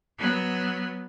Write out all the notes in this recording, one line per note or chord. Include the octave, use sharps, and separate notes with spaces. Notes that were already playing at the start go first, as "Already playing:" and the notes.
F#3 B3